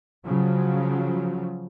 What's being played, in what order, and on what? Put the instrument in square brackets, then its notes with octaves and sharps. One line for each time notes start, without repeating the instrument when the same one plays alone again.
[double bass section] C#3 F3 F#3